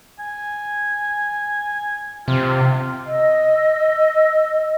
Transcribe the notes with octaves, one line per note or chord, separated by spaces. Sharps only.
G#5
C3 F4
D#5 E6